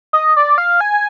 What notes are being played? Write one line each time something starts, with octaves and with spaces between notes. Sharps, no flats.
D#5
D5
F5
G#5